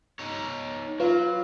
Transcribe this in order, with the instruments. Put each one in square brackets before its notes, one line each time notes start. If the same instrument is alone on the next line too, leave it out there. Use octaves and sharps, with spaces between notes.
[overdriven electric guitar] D#4 C#5
[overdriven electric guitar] F#3 [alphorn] F4 [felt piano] B4 F5